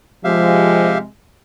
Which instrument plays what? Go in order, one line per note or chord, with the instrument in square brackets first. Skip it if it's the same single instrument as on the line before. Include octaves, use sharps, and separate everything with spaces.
[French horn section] C3 G#3 [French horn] F3 [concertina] G4 E5 F5